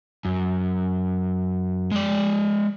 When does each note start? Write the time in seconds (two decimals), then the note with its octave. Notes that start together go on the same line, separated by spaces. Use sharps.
0.25 F#2
1.92 G#3 D5